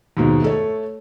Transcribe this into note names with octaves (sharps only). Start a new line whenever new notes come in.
D#2 G#2 B2
A3 A4 C#5